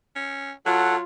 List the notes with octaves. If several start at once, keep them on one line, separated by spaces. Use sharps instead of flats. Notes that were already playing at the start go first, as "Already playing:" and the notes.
C#4
F#3 F4 A4 F#5